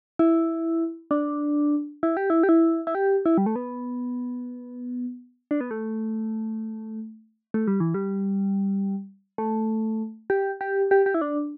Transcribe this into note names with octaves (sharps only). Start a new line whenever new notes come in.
E4
D4
E4
G4
E4
G4
E4
E4
G4
E4
G3
A3
B3
D4
B3
A3
A3
G3
E3
G3
A3
G4
G4
G4
G4
E4
D4